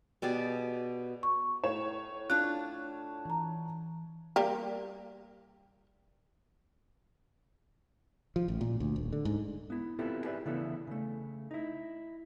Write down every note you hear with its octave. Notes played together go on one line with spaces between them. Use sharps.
B2 G4 G#4 D5
C#6
A2 C#5 E7
D4 F4 F#6
E3 A#5
G3 A#3 G4
F3
A1
A#2
D2
D#1
D3
G#2
B3 E4
B3 C4 E4 F4 G4 A4
E4 G4 G#4 B4 D5 E5
C#3 E3 B3 D4 E4 A4
C#3 A3
D#4 E4